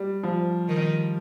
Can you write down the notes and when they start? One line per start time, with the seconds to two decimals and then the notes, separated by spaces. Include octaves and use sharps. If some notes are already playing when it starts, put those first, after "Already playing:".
Already playing: G3
0.23 F3
0.68 D#3